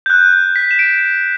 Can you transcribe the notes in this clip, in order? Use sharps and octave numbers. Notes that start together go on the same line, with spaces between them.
G6
F#6
F#6
G6
B6
E7
D7